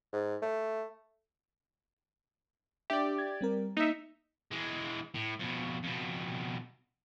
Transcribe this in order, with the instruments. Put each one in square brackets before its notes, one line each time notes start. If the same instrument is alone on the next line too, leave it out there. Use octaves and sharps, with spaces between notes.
[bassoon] G#2
A3
[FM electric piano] D4 E5 [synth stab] G4 D5
[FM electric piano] G#6 A6
G3 C4 A#4
[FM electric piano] A#3 C#7 [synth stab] D#4 E5
[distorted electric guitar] E3 G#3
A2
F2 B2
F2 B2